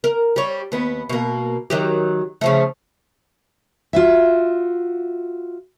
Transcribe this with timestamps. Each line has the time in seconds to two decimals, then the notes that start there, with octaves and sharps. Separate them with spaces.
0.04 A#4
0.36 G3 C#5
0.72 D#2 B3
1.09 B2 A#3
1.70 D#3 F#3 G4
2.41 C#3 F3 A3
3.93 F4 F#4 E5